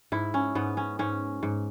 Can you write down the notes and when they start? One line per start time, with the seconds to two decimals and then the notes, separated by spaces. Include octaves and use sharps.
0.12 G#2 E4
0.34 C#4
0.55 G#2 B3
0.77 C#4
0.99 G#2 C#4
1.43 G#2